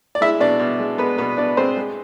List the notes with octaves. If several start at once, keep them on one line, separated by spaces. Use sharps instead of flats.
D5
G#3 E4 E5
B2 D4 D5
B2
G#3
G#3 B3 B4
B2 B3 B4
B2 D4 D5
G#3 C4 C5
G#3